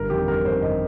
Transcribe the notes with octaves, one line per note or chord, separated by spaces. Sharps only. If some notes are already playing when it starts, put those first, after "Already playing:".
Already playing: G1 A#4
F2 D#3 G4
G1 A#4
F2 D#3 C5
G1 D#5